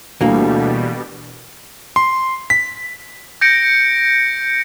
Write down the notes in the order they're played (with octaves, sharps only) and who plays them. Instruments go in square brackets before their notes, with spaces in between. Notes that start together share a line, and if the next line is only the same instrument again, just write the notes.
[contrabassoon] D2 [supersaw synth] B2 G3 [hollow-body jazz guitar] E3 A#3
[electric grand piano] C6
B6
[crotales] G6 A#6 C#7 D7